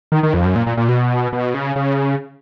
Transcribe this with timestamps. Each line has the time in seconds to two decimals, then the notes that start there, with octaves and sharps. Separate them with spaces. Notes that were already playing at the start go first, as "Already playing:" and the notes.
0.12 D#3
0.23 D#3
0.34 F2
0.45 F#2
0.56 A#2
0.67 A#2
0.77 A#2
0.88 B2
1.33 B2
1.54 C#3
1.76 C#3